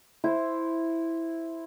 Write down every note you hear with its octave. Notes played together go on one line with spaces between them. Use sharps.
E4 C5